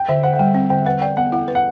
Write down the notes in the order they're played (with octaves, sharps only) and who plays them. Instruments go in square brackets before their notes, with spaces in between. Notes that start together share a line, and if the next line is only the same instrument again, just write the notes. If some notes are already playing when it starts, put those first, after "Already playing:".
Already playing: [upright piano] G5
[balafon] D3 [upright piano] E5
[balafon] D3 [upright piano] F#5
[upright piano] F#5
[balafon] G3 [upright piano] G5
[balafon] C4 [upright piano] G5
[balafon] D3 [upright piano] G5
[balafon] B4 [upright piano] F#5
[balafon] D5 [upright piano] G5
[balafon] B3 [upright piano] F#5
[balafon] E4 [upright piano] F#5
[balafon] B4
[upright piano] F#5